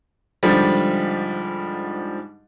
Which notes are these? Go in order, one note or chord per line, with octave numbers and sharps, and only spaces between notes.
G#2 D3 F3 G3